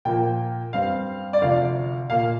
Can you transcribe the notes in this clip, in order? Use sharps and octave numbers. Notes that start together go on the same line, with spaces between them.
A#2 F3 A#3 G5
G2 G3 C4 F5
D5
D2 C3 F3 F5
A#2 A#3 F5